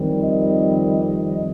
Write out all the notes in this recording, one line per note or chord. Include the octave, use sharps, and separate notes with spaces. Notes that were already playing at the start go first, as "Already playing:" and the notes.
Already playing: F2 D#3 G3 C4
D#5